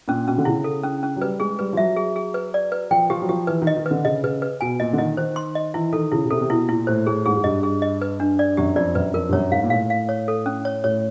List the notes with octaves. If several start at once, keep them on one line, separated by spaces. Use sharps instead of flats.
A#2 C#4
B2 C#4
D3
C#3 E4
A4
C#4
C#4
F#3
G3 B4
G#3 G#4
G3 B4
F3
F#3 E5
G#4
G#4
B4
D5
B4
F3 G5
F3 G4
F#3
F3 G4
E3 B4
D#3
D#5
D#3
B4
D3
C#3 D#5
C#3 B4
B4
B2 G#5
A#2 D#5
D3
D#3 D#5
D#3 C5
C6
D#5
E3 E4
D#3 A4
C#3 E4
C#3
C3 A4
C3
B2 E4
A#2 E4
A2 C5
A2 G#4
G#2 G#4
G#2
G2 D#5
G#4
D#5
B4
D4
D5
F#2 G4
F2 D5
F#2 B4
F2 A#4
G2
F#2 C#5
G#2 F5
A#2
A2 F5
F5
C#5
A4
C#4
C#5
A2 C#5